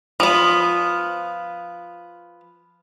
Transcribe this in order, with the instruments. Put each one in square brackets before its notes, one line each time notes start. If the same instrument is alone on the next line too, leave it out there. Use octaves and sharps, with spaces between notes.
[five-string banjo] F3 B3